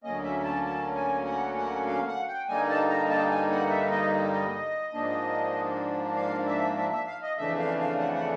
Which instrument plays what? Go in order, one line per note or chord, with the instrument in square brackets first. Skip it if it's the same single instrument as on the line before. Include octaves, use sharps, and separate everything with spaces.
[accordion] D2 D3 F#3 A#3 C#4 D#5
E5
A5
A5
G#5
F#5
F#5
F5
F#5
G5
G2 D3 G3 A#3 D#4 G#5
A5
A#5
A5
G#5
F#5
E5
D#5
D#5
G#2 F3 A#3 D4
F5
E5
E5
E5
F5
D#5
F2 C#3 E3 A3 D4 E5
F5
F5
F#5
F#5